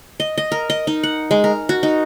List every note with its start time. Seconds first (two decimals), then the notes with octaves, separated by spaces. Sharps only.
0.20 D#5
0.38 D#5
0.52 A#4
0.70 D#5
0.87 D#4
1.03 F#5
1.31 G#3
1.44 A#4
1.69 F#4
1.83 D#4